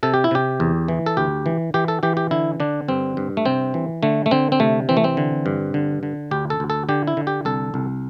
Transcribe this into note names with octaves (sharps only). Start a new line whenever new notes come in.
C3 A4
G4
E4
C3 G4
E2
E3
A4
D2 G4
E3
E3 G4
A4
E3 G4
G4
D3 E4
D3 D4
G2 C4
G2
A3
C3 C4
E3
D3 A3
A3
D3 C4
C4
C3 A3
E3 C4
A3
C4
D3
G2
D3
D3
D2 G4
A4
D2
A4
D3 G4
E4
D3
G4
C2 A4
C2